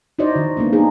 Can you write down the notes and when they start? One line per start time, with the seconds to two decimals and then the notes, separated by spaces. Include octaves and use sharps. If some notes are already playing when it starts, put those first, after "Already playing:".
0.19 D#4 E4 F#4 C5 D5 D#5
0.36 D#3
0.57 A#3 B3 D4
0.73 D#4 G#4